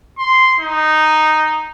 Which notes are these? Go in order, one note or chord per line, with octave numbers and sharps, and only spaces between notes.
C6
D#4